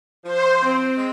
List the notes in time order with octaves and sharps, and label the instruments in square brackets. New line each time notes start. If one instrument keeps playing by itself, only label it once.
[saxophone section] F3 [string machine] C5
[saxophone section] C4
G#3